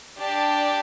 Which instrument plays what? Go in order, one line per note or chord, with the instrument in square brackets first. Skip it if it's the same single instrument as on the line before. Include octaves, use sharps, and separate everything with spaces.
[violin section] D4 G4 D5 A5